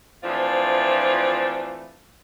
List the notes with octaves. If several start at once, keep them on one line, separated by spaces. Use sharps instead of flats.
E3 F3 A3 C4 D4 F4